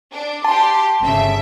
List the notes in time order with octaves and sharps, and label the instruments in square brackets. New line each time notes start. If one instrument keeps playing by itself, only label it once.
[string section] D4
[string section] G4 C6 [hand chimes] A5
[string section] G1 C#3 E5